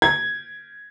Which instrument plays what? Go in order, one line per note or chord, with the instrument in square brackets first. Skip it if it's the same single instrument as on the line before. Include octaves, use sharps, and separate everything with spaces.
[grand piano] G#6